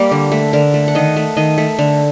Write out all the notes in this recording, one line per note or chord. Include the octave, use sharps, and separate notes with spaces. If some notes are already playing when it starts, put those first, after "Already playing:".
Already playing: G3 A#3 A#4
D3
A3
D3 A#4
A3
F#5
D#3 D#5
A3
D#3 D#5
A3
D3